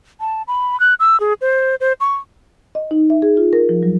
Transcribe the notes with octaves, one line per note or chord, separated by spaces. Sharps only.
A5
B5
F#6
E6
G#4
C5
C5
C#6
D#5
D#4
E5
G#4
F4
A#4
F3
F#3